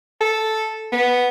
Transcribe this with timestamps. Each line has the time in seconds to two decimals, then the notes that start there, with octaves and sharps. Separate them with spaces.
0.21 A4
0.92 B3